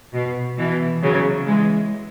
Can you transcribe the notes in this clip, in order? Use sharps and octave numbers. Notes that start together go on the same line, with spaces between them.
B2
B2 E3
C#3 F#3
E3 G#3